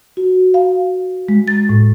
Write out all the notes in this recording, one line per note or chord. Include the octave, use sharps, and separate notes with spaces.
F#4
F5
G#3
A6
A2